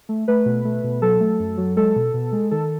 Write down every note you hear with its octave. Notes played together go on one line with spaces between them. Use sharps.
A3
A3 B4
B2
A3
B2
F#3 A4
A3
F#2
F#3
G#3 A4
B2
B2
G#3
D#3 A4